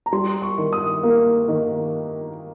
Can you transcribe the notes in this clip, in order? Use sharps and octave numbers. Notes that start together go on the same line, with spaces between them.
A#5
G3 C6
C#6
D#3
D#6
A#3
D#3